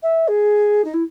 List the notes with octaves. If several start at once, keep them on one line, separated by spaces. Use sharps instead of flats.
E5
G#4
D#4
E4